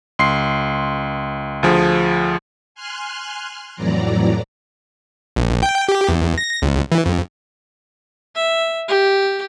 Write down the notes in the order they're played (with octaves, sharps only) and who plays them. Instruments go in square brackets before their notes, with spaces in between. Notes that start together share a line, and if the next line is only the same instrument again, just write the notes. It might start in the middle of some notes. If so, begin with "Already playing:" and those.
[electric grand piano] C#2 C6 C7
D2 F3 G#4
[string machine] G#5 C6 F6 F#6
F2 A2 E3 F#3 D5 A#5
[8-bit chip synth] A#1
G5
G4
E2
A#6
C#2
E3
F2
[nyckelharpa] E5
G4